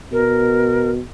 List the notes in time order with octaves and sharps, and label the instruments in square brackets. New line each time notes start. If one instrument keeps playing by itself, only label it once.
[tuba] B2 [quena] A#4